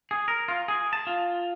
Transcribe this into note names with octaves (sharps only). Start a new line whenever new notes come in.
G#4
A#4
F4
G#4
A5
F4